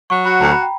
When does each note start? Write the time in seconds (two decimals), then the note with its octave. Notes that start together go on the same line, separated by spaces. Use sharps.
0.10 F#3 C#6
0.25 F#4 B5
0.41 D2 A#5
0.52 B5
0.62 G5